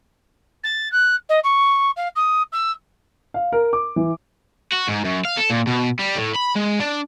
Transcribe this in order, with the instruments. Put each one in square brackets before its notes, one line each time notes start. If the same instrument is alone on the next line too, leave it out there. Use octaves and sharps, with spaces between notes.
[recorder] A6
F#6
D#5
C#6
F5
D#6
E6
[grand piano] F5
A#4
D6
E3
[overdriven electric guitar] F#4
G#2
F#2
F5
A4
A#2
B2
G3
A2
B5
G#3
D4